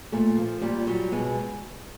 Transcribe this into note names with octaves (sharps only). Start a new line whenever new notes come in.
A#2 A3
F3
A#2 G3
F#3 G3
B2 G#3